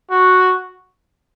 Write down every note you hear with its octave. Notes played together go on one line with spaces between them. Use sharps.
F#4